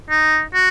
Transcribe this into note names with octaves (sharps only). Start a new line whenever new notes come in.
D#4
F#4